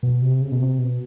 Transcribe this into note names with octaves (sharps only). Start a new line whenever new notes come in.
B2
C3
C#3
B2
C3
B2